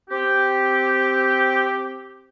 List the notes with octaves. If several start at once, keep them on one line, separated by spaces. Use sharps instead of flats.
C4 G4